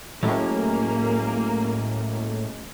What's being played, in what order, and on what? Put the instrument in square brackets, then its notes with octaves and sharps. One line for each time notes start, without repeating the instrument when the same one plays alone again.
[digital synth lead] A2 [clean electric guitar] F#3 G#3 C#4 [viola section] A#3